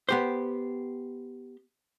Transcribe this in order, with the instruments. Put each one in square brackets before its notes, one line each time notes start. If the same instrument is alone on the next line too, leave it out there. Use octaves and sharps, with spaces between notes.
[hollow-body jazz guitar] B3 G4 C5